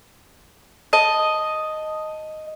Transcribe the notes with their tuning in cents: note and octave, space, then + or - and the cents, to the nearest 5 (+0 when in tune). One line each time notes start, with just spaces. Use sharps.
D#5 +0 A5 +0